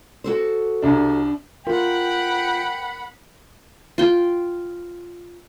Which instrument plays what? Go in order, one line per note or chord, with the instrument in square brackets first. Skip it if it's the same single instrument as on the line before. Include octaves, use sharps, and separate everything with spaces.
[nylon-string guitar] F#4 A4 C5
[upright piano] C2 D4
[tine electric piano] F4 [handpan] A#4 [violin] F#5 B5 [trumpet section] G5
[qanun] F4 G5